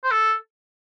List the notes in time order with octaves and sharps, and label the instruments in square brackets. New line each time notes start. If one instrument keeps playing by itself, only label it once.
[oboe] C5
A4